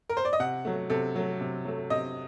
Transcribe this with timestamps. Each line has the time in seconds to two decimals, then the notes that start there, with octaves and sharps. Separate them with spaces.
0.09 A#4
0.17 C5
0.25 D5
0.33 D#5
0.39 C3 F#5
0.65 F#3 A3
0.90 C3 A4
1.16 F#3 A3
1.41 C3
1.65 F#3 A3
1.90 C3 D#5